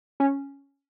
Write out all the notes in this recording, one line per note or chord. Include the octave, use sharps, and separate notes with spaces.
C#4